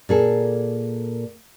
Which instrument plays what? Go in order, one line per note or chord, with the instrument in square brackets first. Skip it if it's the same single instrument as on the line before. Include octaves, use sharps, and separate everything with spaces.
[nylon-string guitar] A#2 G#4 A4